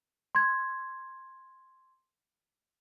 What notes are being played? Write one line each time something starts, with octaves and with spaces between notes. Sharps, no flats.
C6 G#6